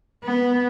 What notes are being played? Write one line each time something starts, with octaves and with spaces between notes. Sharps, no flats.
B3